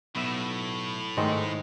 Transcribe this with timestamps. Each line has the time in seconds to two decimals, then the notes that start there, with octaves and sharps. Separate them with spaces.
0.16 B1 A2 B3 E5
1.17 G#2 D#3 G#3 A3 D#4